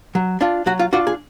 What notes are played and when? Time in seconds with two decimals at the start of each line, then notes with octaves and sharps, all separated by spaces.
0.15 F#3
0.41 D4 F4
0.66 F#3 F#4
0.79 F4
0.93 D4 F4 F#4
1.07 G#4